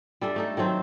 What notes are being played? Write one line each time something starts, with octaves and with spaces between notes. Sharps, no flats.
G3 D4 A4 E5
A3 D#4 A4
D#3 F#3 A3 C4